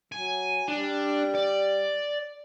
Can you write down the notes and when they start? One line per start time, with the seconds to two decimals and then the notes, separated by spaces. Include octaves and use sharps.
0.12 F#3 G#5
0.68 G3 D4
1.35 D5